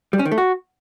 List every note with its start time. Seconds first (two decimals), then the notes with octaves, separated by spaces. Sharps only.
0.13 G3
0.19 C#4
0.25 D#3
0.32 A3
0.38 F#4